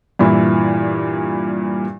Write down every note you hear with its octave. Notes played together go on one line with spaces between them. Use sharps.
G2 A#2 E3 E4